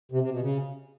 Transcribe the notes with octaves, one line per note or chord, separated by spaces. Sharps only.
C3
C3
B2
C#3